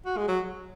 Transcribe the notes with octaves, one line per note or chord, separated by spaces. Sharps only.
F#4
G#3
F#3